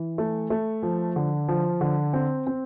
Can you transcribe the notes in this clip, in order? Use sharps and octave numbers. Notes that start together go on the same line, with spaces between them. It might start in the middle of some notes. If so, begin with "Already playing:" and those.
Already playing: E3
A3
A3
F3
D3
F3
D3
C4
C4